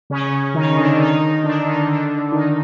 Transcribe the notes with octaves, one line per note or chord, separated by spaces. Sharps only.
C#3 C#4
D#3 D#4
D3 D4
D#3 D#4
D3 D4
D#3 D#4
D3 D4
D#3 D#4